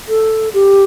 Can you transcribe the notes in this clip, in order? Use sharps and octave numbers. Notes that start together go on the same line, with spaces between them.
A4
G4